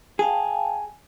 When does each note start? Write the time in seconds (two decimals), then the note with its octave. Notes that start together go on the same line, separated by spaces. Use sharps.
0.19 G#4 F5 G5 A5